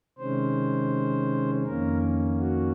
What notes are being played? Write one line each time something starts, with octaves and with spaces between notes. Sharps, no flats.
C3 D#3 G#3 C#4 C5
F2 D#3 A#3 C#4 A#4
F#4